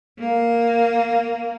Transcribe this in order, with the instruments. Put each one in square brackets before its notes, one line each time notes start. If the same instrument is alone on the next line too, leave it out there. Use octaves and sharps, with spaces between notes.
[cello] A#3